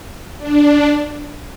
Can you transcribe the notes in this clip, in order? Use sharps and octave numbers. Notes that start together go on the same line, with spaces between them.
D4